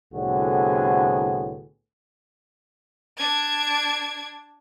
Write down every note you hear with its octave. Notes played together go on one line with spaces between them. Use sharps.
C2 A2 D3 B3 F#4 G#4
D4 G#6